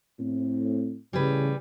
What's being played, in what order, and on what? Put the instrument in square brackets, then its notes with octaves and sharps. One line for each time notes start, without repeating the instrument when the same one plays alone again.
[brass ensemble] A2 C4
[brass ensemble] A1 [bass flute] C#3 [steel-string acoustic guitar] G3 G#4 B4